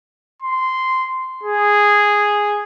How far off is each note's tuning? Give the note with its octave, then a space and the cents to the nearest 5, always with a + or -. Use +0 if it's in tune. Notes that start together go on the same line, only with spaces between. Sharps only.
C6 -10
G#4 -5